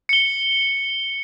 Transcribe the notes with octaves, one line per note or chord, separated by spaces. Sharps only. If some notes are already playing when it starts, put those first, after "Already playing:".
C#7 G7